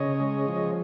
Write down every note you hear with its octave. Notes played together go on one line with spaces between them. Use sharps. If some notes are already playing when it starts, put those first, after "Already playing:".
Already playing: C#3 C#5 D#5
G#3
F3